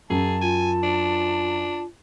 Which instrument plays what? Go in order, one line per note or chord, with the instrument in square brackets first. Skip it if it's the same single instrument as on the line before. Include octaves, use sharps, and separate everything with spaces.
[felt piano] F#2 [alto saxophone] G#4 [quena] A5
[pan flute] F4 [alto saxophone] G#5
[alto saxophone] D4